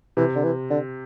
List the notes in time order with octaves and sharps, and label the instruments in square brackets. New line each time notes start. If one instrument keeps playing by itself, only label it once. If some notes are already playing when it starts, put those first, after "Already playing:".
[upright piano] C3 [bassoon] E3
[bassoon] D3
E3
D3